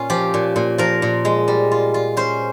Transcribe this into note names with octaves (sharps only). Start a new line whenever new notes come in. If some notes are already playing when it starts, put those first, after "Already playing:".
Already playing: A#2 C#4 F4
F3 G4
A#2
A#2
F3 A#4
A#2
G#3
G3
F4
F4
C#4 C5